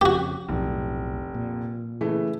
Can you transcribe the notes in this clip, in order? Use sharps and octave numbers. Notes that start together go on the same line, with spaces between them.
F2 C#3 F#4 G4
F1 B1 A2
A#2
C#3 E3 A3